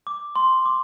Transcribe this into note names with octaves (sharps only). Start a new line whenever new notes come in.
D6
C6
D6